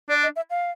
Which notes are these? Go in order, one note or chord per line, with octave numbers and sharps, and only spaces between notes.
D4 D5
D#5
E5
F5